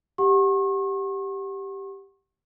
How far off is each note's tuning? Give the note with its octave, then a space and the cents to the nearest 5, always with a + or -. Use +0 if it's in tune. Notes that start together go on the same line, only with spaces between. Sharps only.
G4 +0 F#5 +0 C#6 -40